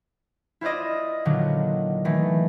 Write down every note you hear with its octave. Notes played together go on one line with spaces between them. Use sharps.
E4 F4 C5 D5 D#5
A#2 D3 D#3 F#3
D#3 E3 A3